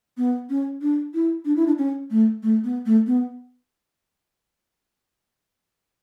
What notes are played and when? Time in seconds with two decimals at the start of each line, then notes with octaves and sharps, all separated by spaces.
0.17 B3
0.50 C#4
0.81 D4
1.14 E4
1.45 D4
1.56 E4
1.67 D4
1.78 C#4
2.11 A3
2.43 A3
2.64 B3
2.86 A3
3.07 B3